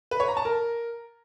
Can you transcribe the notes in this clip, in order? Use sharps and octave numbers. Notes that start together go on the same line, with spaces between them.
B4
C#5
A#5
A5
A#4